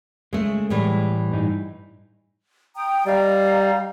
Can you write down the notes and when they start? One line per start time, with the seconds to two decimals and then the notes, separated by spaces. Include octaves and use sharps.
0.33 C#3 G#3 A3
0.70 A2 E3 G3
1.31 G2 D#4
2.76 G5 A#5 D#6
3.06 G3 D#5 F5 A#5